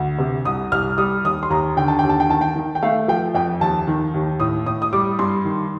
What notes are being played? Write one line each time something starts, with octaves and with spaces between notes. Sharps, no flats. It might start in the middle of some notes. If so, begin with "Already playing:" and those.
Already playing: D2
C3
C2 D#6
C2 F6
G3 D#6
D#2 D#6
C6
D#2 A#5
D3 G5
A5
D#2 G5
A5
G5
D#3 A5
G5
D#3
G5
A3 F5
F3 G5
F2 G5
D#2 A5
D#3
D#2
A2 D#6
A2 D#6
D#6
G3 D6
G2 C6
D#3